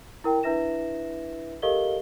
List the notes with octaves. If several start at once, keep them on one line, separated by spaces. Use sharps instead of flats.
E4 A#4 G5
D4 E4 B4 E5 A#6 E7
G4 A4 A#4 D#5 F5 G7